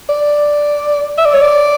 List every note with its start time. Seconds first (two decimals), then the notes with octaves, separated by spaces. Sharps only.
0.09 D5
1.18 E5
1.26 D5
1.34 C#5
1.42 D5